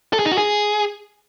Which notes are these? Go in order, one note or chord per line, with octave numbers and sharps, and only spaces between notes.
A4
G#4
D#4
F#4
G#4